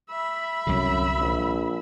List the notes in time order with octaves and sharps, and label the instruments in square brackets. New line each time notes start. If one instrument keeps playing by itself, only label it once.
[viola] E5 B5
[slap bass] C2 D3 [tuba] F#2
[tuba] A#1